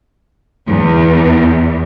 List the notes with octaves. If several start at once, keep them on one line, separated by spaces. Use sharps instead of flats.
E2